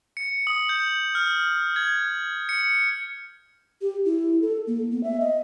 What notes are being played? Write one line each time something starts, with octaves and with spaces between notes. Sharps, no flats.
C#7
D#6
G6
F6
G#6
C#7
G4
E4
A4
A#3
B3
E5
D#5